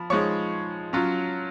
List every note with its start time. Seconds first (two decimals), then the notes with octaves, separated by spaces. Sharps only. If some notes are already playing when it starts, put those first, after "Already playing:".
Already playing: F3 B5
0.10 F3 G#3 D#4 C#5 C#6
0.93 F#3 C#4 F4